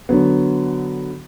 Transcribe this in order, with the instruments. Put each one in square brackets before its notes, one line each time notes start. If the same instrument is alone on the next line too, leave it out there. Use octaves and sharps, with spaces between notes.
[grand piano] D3 F#3 B3